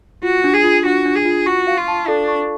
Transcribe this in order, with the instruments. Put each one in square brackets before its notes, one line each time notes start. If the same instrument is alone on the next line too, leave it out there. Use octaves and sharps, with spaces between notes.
[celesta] F4 [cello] F#4
[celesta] D4
[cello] G#4
[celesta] F4
[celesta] D4 [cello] F#4
[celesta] D4
[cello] G#4
[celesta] F4
[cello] F#4 [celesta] C#6
[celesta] F5
[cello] F4
[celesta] A5
[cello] D4 [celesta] A4
[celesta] C#6